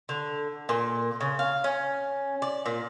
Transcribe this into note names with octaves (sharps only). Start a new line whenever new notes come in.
D3
A#2
C#3
F5
C#4
D5
A#2